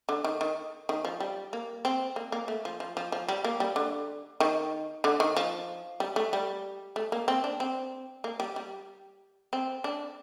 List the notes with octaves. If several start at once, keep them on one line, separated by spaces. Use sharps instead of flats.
D3
D#3
D#3
D#3
F3
G3
A#3
C4
A#3
A#3
A3
F3
F3
F3
F3
G3
A#3
G3
D3
D#3
D3
D#3
F3
G3
A3
G3
A3
A#3
C4
D4
C4
A#3
G3
G3
C4
D4